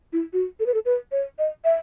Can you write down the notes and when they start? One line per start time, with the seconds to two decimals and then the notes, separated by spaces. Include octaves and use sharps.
0.13 E4
0.33 F#4
0.60 A4
0.66 B4
0.74 A4
0.85 B4
1.12 C#5
1.38 D#5
1.64 E5